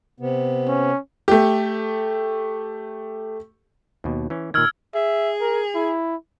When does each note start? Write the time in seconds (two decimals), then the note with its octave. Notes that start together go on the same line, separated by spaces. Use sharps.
0.20 C3 B3
0.67 C#4
1.28 A3 G4
4.04 D#2 B2
4.30 E3 C#4
4.54 A#2 D#3 E6 F6 G#6
4.95 G#4 E5
5.41 A#4
5.75 E4